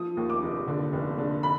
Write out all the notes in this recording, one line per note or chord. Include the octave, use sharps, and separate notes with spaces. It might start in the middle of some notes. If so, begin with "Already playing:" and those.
Already playing: F3 D#6
D#2
D6
F1
D3
F1
D3
B5